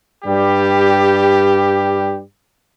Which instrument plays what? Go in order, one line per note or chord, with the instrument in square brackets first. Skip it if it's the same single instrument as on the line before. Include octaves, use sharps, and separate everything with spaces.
[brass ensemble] G2 G3 G4